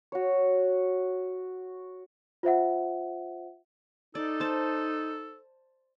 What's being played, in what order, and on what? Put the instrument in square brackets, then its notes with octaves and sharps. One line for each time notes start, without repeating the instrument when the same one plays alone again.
[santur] F#4 C#5
[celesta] F4 C5 E5 F#5
[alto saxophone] D#4 [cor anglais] A4 [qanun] D5
[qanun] C5 A5